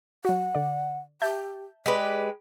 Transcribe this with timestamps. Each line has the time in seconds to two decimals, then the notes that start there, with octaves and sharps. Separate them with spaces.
0.25 F#3 F#4 F#5
0.55 D3 D5
1.22 G4 E5 A5 G6
1.86 G#3 G4 B4 D5